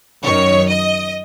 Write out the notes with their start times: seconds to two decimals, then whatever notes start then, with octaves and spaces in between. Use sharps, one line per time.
0.23 F#2 D#3 C#5
0.69 D#5